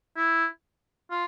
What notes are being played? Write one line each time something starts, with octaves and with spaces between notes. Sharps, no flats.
E4
F4